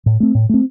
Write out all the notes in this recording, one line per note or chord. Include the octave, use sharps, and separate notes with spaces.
A2
A3 C4
A2
A3 C4